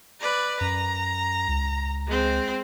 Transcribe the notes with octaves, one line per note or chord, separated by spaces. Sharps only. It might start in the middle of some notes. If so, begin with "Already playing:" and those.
B4 D5
F#2 A#5
C#2
G#3 C4